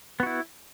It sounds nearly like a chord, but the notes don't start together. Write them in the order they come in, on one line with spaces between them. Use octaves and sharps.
B3 F#4 E4